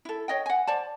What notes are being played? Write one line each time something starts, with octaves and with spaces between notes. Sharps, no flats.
E4 A4
C#5 D#5 G5
F#5 G#5
C5 D5 A5